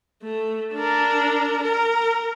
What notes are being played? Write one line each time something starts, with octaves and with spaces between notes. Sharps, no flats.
A3
D4 A#4
A#4